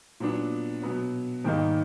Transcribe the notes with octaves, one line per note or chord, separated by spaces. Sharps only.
A#2 F#3 B3 D4
B2 F#3 B3
G#2 D#3 G3 A#3 D#4